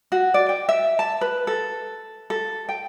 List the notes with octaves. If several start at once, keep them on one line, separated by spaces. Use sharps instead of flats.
F#4
D5
G5
E5
A5
B4
A4
A4
G5